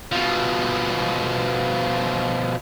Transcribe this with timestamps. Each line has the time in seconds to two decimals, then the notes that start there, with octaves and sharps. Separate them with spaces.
0.12 B2 F3